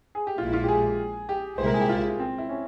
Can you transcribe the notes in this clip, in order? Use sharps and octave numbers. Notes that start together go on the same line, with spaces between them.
G#4
G4
A#1 A#2 G#3 E4 F4
F4
G4
G#4
G4
C2 A#2 G#3 E4 C5
A#4
G#4
G4
F4
C4
E4
C#4